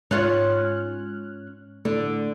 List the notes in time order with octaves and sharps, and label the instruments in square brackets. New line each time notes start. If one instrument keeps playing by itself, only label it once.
[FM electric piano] G#2 F6 F#6 [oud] C#4 F4 C#5
[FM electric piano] A2 [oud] D3